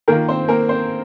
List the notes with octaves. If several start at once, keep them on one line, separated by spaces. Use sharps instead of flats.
D#3 A#3 F4 A#4
C4 C5
A#3 A#4
C4 C5